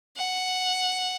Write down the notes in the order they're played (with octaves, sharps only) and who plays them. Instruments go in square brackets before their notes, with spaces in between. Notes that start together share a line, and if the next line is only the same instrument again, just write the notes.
[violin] F#5